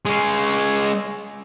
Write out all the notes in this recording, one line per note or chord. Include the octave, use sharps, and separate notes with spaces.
G#3 C#4